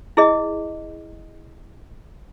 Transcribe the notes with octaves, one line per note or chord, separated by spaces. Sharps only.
E4 G#4 D#5